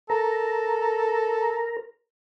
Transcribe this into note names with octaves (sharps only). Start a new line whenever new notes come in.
A4 A#4 A#5